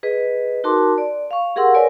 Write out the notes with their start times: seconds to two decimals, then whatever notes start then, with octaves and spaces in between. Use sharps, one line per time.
0.03 G#4 B4 D#5
0.64 D#4 F#4 A#4 A5 C6 D6
0.98 D5
1.31 F5 C#6
1.56 G4 G#4 A#4 F#5 C6 E6
1.74 A#4 B4 C#5 D5 G#5